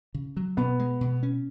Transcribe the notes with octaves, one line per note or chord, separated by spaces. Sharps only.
C#3
F#3
B2 B3
G#3
B2
C#4